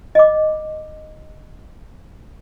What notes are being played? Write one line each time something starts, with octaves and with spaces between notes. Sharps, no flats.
D#5 D6